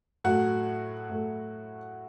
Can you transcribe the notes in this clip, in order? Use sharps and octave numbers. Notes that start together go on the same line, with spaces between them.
A2 F#3 A3 F#4 F#5
A2 F#3 A3